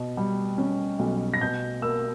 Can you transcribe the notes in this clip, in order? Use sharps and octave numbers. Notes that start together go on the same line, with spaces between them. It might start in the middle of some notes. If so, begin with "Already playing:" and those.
Already playing: B2
G3
C#4
B1
A#6
B2 G6
A#3 E6